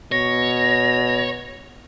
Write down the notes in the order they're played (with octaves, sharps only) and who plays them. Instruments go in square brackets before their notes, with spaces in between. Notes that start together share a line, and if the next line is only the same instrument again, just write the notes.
[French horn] B2 [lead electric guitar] C#5 [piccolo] A#6